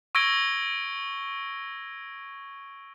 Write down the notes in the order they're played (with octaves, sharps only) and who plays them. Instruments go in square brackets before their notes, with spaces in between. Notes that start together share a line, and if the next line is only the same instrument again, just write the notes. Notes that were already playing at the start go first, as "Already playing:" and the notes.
[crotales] C#6 E6 G#6 A#6 D7 G7